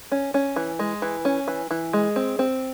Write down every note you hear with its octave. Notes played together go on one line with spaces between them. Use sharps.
C#4
C#4
E3
G#3
E3
C#4
E3
E3
G#3
C4
C4